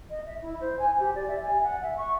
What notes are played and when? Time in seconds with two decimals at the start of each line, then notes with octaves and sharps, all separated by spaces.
0.10 D#5
0.26 E5
0.42 E4
0.61 C5
0.79 G#5
1.00 G4
1.15 D5
1.28 E5
1.43 G#5
1.63 F#5
1.82 E5
1.98 C#6